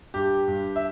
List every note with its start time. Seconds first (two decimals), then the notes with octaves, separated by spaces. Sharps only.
0.14 G2 G4
0.48 G2
0.76 E5